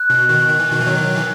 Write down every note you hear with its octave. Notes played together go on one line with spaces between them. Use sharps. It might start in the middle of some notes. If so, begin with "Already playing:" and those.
Already playing: F#6
B2
B2 D#3
D#3
E3
B2 D#3
E3
D#3 F#3
E3